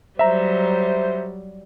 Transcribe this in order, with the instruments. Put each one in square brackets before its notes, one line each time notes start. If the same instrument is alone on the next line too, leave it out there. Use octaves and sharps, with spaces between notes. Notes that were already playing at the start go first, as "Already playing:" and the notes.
[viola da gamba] F#3 G3 [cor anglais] C5 [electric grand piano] E5 A#5